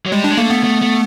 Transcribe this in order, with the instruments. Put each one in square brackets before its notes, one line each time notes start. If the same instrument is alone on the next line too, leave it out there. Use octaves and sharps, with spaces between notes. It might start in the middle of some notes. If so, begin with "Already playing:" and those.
[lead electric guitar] F#3
[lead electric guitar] G3 [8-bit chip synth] G#3
[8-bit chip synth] D4
[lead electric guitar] G#3
[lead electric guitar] A3 [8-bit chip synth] A#3
[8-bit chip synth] B3
[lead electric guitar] A3
A3